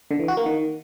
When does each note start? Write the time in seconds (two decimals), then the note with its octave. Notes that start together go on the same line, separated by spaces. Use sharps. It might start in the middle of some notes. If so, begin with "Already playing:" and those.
0.11 D3
0.19 E3
0.28 F#4
0.37 A#3
0.46 D#3